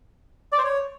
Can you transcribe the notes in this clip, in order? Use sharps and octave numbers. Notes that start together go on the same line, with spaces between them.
D5
C5
C#5